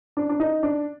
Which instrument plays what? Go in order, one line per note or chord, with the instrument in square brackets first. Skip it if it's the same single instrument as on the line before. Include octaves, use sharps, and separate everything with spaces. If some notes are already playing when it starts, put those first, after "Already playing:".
[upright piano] D4
D4
D#4
D4